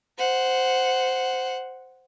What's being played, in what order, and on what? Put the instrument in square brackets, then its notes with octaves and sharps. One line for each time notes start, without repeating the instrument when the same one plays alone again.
[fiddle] C5 F#5